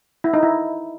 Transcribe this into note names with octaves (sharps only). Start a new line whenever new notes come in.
E4
D#4
E4